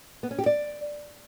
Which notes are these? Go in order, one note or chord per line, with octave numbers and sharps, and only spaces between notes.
B3
C#4
G4
D5